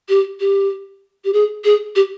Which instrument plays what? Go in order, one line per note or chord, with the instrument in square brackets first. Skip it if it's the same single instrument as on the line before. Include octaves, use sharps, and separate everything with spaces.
[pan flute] G4
G4
G4
G#4
G#4
G4